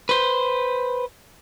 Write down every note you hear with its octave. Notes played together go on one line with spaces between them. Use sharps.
B4 C5